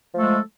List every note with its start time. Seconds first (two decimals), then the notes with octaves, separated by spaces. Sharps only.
0.14 F3
0.16 A3
0.19 A4
0.22 G#3